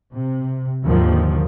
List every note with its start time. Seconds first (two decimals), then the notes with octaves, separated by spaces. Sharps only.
0.13 C3
0.85 D#2 G#2 D3 D#3 F3